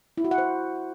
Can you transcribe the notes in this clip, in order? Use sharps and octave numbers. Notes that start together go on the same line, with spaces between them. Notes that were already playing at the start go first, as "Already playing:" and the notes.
E4
F#4
F#5
C5